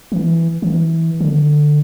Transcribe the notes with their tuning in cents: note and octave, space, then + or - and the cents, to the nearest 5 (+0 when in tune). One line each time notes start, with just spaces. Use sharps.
E3 +5
E3 -15
D3 +15